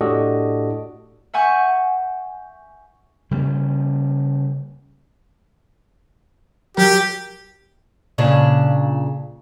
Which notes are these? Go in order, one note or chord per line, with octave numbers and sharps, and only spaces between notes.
A2 D4 F#4 G4 A4 D#5
E5 F#5 G#5 C#6 G6
C#3 G3 A#3 C#4
F#3 G4 A#4
A#2 C#3 D4